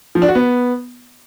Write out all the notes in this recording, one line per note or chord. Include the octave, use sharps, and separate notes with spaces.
F3
D4
F#4
B3